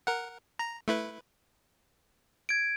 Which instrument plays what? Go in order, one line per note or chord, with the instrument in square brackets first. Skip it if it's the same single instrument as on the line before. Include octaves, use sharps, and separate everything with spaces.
[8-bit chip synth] A#4 F#5
A#5
A3 E4 B4
[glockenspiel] G#6 D7